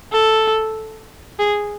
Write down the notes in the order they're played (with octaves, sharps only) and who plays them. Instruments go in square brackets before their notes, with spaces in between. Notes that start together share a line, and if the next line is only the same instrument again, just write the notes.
[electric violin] A4
G#4